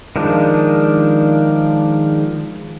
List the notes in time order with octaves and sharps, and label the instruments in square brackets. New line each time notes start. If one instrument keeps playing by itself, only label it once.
[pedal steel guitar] D#3 F3 G#3 D4